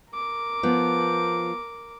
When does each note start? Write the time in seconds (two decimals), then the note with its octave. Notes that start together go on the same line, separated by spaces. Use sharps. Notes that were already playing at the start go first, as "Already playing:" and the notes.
0.14 A#4 D6
0.63 F3 B3